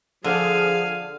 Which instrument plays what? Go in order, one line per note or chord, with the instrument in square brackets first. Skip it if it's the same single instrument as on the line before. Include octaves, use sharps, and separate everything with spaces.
[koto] D3 [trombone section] F3 [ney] G#4 [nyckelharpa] F5 G#5